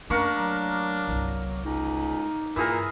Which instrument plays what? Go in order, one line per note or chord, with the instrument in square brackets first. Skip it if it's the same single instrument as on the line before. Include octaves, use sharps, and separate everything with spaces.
[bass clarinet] F#2 [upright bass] A3 [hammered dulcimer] A#3 A#4 C#6 [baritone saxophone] D4
[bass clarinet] F#3
[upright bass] G1 C2
[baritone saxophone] C#2 [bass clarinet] D#4
[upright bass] G2 [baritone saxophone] A#2 [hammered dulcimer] E3 G#4 A#4